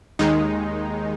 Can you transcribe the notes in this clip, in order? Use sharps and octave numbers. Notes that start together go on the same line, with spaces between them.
D#2 D#3 G#3 D#4